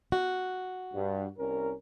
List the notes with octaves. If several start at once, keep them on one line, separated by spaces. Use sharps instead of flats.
F#4
G2
C2 C#4 A#4